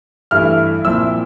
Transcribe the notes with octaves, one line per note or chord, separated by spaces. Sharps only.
G2 E3 A3 E4 F6
A#2 F3 C4 E4 E6